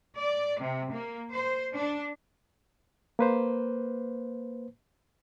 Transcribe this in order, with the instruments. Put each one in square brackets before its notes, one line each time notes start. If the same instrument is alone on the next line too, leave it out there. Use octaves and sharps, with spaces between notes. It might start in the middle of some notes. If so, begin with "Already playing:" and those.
[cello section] D5
C3
A#3
C5
D4
[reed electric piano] A#3 B4 C5